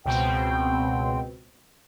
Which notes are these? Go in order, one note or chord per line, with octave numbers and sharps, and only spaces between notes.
C#2 B2 C4 G5